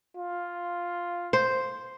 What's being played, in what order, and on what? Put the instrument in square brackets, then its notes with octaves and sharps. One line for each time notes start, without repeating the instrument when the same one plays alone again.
[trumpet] F4
[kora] C5